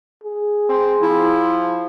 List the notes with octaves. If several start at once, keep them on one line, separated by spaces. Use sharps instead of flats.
G#4
C4
F3 E4